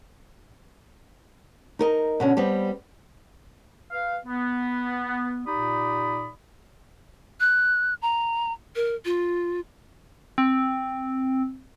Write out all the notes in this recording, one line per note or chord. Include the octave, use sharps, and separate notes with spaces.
D#4 A#4 D#5
B2 D3 C#4
G3 B3 C4
B4 F5
B3
A#2 D#4 G4 D5 B5 D#6
F#6
A#5
A#4
F4
C4